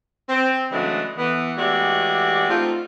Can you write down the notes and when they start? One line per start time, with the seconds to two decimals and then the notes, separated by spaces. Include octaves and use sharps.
0.29 C4
0.71 C#3 E3 F#3 G#3 A3 D4
1.18 E3 B3
1.57 E3 G#3 A3 F#4 G4 D5
2.49 A3 C4 D#4 F4